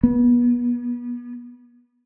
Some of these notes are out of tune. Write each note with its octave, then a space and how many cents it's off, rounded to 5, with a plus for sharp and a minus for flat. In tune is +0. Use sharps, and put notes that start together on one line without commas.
B3 -30